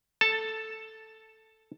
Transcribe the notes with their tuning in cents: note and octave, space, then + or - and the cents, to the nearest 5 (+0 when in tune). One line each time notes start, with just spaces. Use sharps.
A4 +0 A5 +10